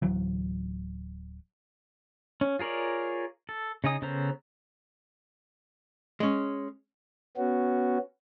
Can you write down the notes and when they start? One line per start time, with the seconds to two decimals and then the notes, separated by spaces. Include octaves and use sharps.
0.02 D1 E3 F#3
2.41 C#4
2.59 F4 G#4 A#4 C#5 D5
3.49 A4
3.84 C#3 D#4 G#5 D#6
4.02 C#3 B3 A4 C5 A#5
6.20 G#3 C#4
7.37 B3 C#4 F#4